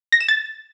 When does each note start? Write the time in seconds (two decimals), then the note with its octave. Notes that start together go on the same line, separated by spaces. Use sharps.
0.12 A#6
0.20 E7
0.28 A6